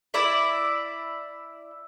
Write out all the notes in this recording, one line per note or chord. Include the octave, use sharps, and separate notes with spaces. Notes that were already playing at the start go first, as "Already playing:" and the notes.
E4 D5 E5